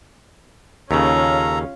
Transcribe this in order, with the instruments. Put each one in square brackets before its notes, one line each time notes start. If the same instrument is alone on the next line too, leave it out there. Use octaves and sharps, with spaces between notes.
[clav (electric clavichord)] D#2 C#3 [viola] C#4 F4 [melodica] A4 A#5